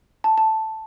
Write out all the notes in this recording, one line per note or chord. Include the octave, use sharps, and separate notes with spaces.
A5
A5